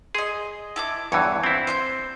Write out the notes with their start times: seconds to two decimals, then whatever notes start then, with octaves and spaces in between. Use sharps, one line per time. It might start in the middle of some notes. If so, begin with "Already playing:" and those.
0.15 G#4 D#5 C6
0.76 E4 A5 D6
1.12 E2 G2 E3 C#5
1.44 C4 E4
1.67 C5 C6 G6